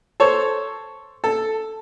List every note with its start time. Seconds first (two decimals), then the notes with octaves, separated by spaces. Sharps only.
0.20 A4 C5 C#5
1.24 A4